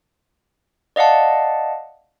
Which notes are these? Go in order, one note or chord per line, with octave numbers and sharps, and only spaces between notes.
D5 D#5 F5 F#5 A5